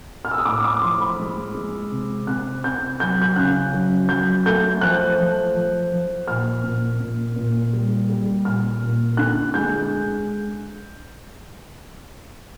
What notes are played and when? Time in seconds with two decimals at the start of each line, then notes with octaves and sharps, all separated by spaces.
0.25 F6
0.31 E6
0.38 D#6
0.46 A2 D6
0.64 D6
0.82 F3 C6
1.00 B5
1.19 G#3
1.55 G#3
1.91 C3
2.27 C3 F#6
2.64 C3 G6
3.00 F#3 G6
3.22 G6
3.36 C#3 F#6
3.73 F#3
4.09 F#3 G6
4.46 A3 G6
4.81 F3 F#6
5.19 F3
5.55 F3
5.91 F3
6.27 A#2 F6
6.64 A#2
7.00 A#2
7.36 A#2
7.73 G3
8.10 G3
8.45 A#2 F6
8.82 A#2
9.17 D3 F#6
9.54 G#3 G6